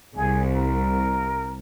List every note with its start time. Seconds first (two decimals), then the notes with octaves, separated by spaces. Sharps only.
0.16 C2 G#4
0.54 A#4